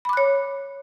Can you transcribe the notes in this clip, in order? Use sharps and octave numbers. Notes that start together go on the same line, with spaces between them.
C#5 B5 D6 F#6